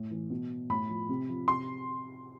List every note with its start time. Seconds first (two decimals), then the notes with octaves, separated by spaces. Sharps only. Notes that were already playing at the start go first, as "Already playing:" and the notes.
Already playing: A2
0.11 E3
0.30 B2
0.70 A2 B5
0.89 F3
1.09 C3
1.29 F3
1.48 C3 C6